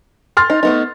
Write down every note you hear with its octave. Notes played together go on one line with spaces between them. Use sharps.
C6 F6 A6
D#4
A3 B3 D#4